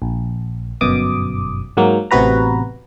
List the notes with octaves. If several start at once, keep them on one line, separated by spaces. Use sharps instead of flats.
A#1
G1 F#2 B2 D6 D#6
G#2 F#3 A#3
A1 C3 B3 F#4 B4 A#5